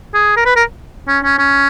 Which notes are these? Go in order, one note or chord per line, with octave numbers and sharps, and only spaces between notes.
G#4
A#4
B4
A#4
C#4
C#4
C#4